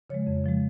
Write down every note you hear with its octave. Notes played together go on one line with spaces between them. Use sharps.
C#3 F3 G#3 C#5
F2
C#3 F3 G#3